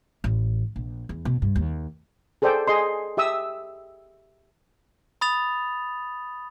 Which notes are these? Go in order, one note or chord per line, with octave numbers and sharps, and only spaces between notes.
A1
A#1
E2
B2
G2
D#2
G#4 A4 C5 D5 G5
G#4 D#5 C6
G4 E5 D#6 E6
B5 D#6 A6 F7